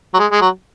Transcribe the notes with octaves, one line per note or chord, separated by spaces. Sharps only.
F#3
G#3
G#3
F#3